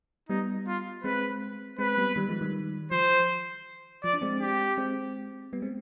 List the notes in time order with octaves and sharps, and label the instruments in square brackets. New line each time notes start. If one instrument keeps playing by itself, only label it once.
[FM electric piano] G3 B3 [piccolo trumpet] D#4
[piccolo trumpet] F4
[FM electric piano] G#3 C4 [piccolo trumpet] B4
[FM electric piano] G#3 C4 [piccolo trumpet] B4
[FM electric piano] G3 B3
D#3 G3
F3 G#3
D#3 G3
[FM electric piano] F3 [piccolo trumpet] C5
[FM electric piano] F3 [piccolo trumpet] D5
[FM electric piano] D4
G#3 C4
[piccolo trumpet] G4
[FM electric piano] G#3 C4
G3 B3
G#3 C4